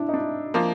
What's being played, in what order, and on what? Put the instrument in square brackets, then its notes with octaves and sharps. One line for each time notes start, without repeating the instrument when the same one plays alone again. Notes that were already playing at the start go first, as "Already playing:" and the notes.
Already playing: [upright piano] D4 E4
D#4
D4
[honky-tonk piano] F3 A#3